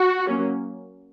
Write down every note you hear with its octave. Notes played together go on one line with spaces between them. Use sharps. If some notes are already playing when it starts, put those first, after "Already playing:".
Already playing: F#4
F#3 A#3 C#4